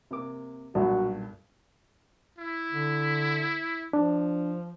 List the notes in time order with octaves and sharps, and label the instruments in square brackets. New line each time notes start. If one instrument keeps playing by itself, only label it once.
[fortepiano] C3 A#3 D6
[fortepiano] B1 G2 A#2 [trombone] F#4
[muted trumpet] E4
[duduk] D3
[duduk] F3 [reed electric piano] D4